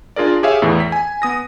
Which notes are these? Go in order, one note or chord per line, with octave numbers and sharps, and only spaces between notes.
D4 F4 G#4 A#4 D5
G4 G#4 C#5 E5 F5
E2 A2 E3
B6
G#5
B3 D#6 A#6